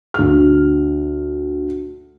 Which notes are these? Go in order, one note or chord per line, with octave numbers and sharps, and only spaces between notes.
D2 F6